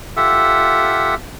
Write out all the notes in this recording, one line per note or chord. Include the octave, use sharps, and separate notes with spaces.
F4 G4 A4 E5 F#5 E6